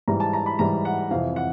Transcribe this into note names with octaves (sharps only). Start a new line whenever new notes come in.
G#2 E3 G3 A#5
A5
A#5
B5
G#2 E3 G3 A#5
F#5
F2 C3 E3 F5
F#5